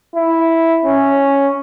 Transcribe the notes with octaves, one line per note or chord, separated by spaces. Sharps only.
E4
C#4